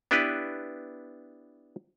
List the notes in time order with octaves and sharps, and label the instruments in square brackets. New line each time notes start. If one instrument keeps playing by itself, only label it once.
[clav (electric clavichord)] B3 D4 E4 G4 B4